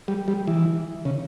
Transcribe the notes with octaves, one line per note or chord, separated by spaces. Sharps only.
G3
G3
E3
C#3